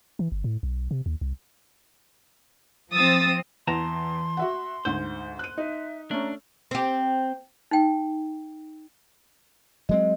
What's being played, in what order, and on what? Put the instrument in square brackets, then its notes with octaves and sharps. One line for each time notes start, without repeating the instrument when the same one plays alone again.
[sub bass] E3
G1
A2
B1
C3
D#2
C2
[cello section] F3 C4 [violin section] D#6 E6 A6
[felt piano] E2 A#6 [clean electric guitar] E3 A5 A#5 [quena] C6
[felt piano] F#4 E5 F#5
[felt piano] D2 G#2 G6 [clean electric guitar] C5
[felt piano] F#6 D#7
[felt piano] D#4 [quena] E5
[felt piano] A3 C#4 [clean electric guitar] D4 [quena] A#5
[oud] C4 G4
[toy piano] D#4 G5
[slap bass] F#3 G#3 C4 [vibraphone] D#5